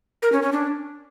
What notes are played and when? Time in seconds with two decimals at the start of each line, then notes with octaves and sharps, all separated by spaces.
0.22 A#4
0.32 C#4
0.42 C#4
0.52 D4